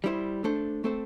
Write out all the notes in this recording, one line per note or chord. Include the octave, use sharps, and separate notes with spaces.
G3 E4 C5
A3 D4 A4 C5
A3 C4 A4 C5